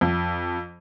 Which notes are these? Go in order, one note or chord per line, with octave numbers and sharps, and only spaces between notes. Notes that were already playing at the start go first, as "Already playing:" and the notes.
F2